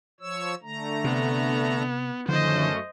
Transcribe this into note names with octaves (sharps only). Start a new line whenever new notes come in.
F3 C#5 E6
D3 A3 A#5
C3 B3
F#2 D3 D#3 F3 A3 C#4 C5 D#5